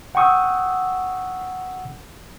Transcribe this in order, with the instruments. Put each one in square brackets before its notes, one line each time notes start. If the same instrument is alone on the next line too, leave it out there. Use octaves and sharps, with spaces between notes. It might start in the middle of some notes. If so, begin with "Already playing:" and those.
[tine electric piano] F#5 G5 C#6 D#6 E6